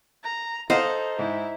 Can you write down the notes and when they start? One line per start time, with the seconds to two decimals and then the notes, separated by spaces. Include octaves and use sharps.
0.23 A#5
0.70 D#4 A4 C5 D#5 F5 F#5
1.19 G#2 E4